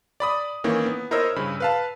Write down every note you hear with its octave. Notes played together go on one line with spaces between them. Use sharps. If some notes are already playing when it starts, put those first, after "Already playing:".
D5 B5 D#6
D#3 E3 A#3 C#4
B3
E4 A#4 C5 C#5 D#5 E6
G2 C#3 B5
B4 F5 A5